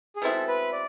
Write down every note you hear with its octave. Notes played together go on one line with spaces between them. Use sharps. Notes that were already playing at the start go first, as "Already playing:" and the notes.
G#4
B2 G#3 C4 E4 A4
B4
D5